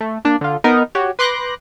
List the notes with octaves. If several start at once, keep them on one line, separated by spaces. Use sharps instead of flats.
A3
A#3 D4
D3 F4
B3 D#4 A#4
F#4 G4 C#5
B4 C6 D6 F#6 G6 A#6